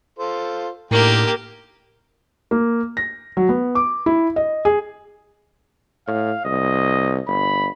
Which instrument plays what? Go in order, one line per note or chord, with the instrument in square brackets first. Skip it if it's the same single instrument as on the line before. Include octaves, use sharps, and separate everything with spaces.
[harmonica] F4 A4 C5
[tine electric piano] A2 [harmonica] D3 D#3 G5 [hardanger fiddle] A#3 G4 [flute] A#4
[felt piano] A#3
A#6
F#3
B3
D6
E4
D#5
G#4
[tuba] A2 [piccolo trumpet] F5
[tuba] C2 [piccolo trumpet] D#5
[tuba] G1 [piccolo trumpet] B5